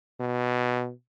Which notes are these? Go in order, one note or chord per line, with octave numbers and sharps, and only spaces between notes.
B2